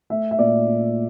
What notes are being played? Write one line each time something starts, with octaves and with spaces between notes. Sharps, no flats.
A3 E5
E5
A#2 D5
A#2